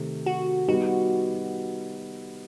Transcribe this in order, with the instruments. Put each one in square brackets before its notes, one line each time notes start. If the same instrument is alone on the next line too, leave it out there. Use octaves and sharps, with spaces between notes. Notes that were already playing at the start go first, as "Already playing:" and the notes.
Already playing: [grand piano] C3 D#3 A3
[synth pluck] F#4
[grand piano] G3 B3 D#4 [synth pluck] F#4